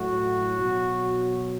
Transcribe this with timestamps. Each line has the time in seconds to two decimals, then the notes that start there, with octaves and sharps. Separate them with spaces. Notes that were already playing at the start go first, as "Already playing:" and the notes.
Already playing: A2 F#3 F#4
0.59 B2 F#3